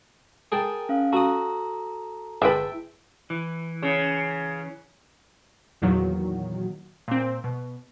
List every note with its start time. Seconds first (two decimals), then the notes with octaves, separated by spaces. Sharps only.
0.52 G#4 A#4 G5 A5
0.89 C#4 F5
1.13 F#4 A4 A#5 D#6
2.42 G1 G#3 E4 B4 E5 G5 A5
3.30 E3
3.82 C#3
5.82 E2 A#2 D#3 F#3
7.08 A#2 C4
7.44 B2